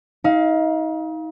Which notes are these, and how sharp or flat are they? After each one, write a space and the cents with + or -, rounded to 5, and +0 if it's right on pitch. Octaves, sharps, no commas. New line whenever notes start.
D#4 +35 F5 +0